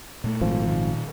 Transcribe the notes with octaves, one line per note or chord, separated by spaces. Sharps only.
A#2 A3
G#1 F3
A#2 D#3